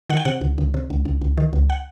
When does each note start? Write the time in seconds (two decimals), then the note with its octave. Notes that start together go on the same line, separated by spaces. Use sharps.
0.10 D#3 F#5
0.17 G5
0.25 C3 F#5
0.41 C#2
0.58 C#2
0.74 C3
0.90 C#2
1.05 C#2
1.21 C#2
1.37 D#3
1.53 C#2
1.70 F#5